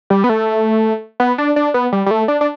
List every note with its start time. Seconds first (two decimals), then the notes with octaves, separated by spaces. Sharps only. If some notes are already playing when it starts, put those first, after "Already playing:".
0.10 G3
0.24 B3
0.29 A3
1.20 B3
1.38 D4
1.56 D4
1.74 B3
1.92 G3
2.06 G3
2.11 A3
2.28 D4
2.41 D4